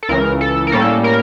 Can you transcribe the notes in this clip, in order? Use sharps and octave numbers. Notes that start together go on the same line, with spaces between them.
A4
C#2 C#3 E3 A#4
A4
A#4
A2 G3 A#3 C#4 A4
A#4